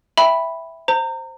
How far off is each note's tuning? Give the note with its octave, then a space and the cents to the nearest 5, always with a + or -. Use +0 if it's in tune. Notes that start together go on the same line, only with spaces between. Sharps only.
E5 +0 G5 +5 B5 +0
C5 +0 A#5 -30